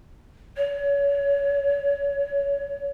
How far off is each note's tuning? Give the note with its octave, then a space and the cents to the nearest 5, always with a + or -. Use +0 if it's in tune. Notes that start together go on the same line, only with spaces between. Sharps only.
C#5 +25